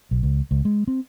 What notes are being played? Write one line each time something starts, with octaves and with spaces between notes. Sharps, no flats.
B1
C#2
C#2
G#3
C4